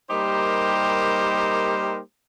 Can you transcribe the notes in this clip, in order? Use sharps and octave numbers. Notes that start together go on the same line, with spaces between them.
G3 A#3 D#4 G4 A#4 C5